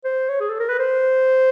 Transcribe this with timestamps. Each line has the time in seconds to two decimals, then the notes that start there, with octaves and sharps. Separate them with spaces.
0.04 C5
0.29 C#5
0.40 G#4
0.49 A4
0.60 A#4
0.69 B4
0.79 C5